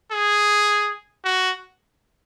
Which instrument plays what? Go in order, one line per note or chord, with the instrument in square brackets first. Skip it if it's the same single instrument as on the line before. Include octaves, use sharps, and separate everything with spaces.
[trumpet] G#4
F#4